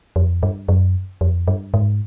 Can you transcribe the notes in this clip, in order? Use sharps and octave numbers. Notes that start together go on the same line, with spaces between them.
F2
G2
F#2
F2
G2
G#2